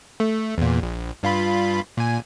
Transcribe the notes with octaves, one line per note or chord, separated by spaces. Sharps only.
A3
E2 A#2
A#1
G2 F4 B5
A#2 G#5